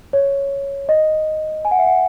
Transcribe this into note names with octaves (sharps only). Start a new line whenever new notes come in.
C#5
D#5
G#5
F#5
E5
F#5